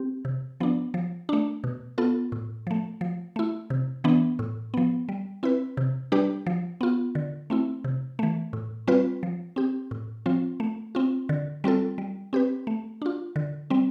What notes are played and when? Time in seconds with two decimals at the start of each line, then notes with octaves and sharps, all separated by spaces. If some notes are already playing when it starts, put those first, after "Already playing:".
Already playing: C4 G4
0.25 C3
0.60 F3 B3 D4
0.94 F3
1.29 A3 D4
1.64 B2
1.98 B3 F4 A4
2.32 A2
2.67 F3 A3
3.01 F3
3.36 A3 E4
3.70 C3
4.04 E3 B3 D4
4.39 A2
4.74 F3 B3
5.09 G3
5.43 C4 E4 B4
5.77 C3
6.12 G3 D4 G4 B4
6.47 F3
6.81 B3 F4
7.15 D3
7.50 A3 C4 E4
7.84 C3
8.19 E3 A3
8.53 A2
8.87 G3 C4 F4 B4
9.23 F3
9.56 C4 G4
9.91 A2
10.26 F3 C4 F4
10.60 A3
10.95 C4 F4
11.29 D3
11.64 G3 C4 F4 A4
11.98 G3
12.33 C4 G4 B4
12.67 A3
13.02 D4 F4
13.36 D3
13.70 G3 C4